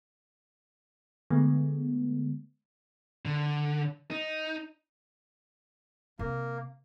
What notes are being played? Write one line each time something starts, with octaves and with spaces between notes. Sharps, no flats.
D3 G#3 A3 B3
D3
D#4
C3 A#3